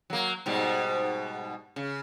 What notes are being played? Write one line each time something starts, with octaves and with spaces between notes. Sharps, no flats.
F#3 A#3
G#2 B2 G3
C#3